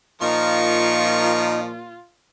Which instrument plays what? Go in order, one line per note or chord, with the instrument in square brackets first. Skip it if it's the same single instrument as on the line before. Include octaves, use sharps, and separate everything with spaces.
[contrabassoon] A#2 [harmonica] F3 A#4 C#6 [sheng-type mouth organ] D#4 [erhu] F4